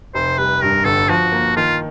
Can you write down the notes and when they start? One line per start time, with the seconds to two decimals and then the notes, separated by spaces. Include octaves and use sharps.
0.14 F1 C5
0.38 G3 B4
0.62 G2 A#4
0.85 G1 A4
1.09 F3 F#4
1.32 A#3
1.57 D#3 F4